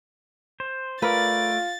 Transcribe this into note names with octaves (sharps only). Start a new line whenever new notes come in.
C5
A3 F4 A#4 B4 D5 A6